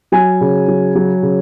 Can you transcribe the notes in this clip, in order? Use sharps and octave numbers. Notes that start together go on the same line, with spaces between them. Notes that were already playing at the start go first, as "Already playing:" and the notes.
F#3 G#5
C#3
F#3
F#3
C#3